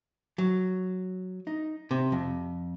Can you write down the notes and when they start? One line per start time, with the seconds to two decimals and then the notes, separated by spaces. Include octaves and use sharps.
0.38 F#3
1.47 D#4
1.91 C3
2.12 F2